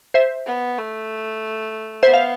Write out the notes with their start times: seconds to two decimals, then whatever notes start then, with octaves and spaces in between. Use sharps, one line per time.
0.14 C5 E5
0.46 B3
0.78 A3
2.03 B3 C5 E5
2.14 F5